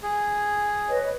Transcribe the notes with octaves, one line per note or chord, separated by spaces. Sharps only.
G#4
B4 C#5 D#5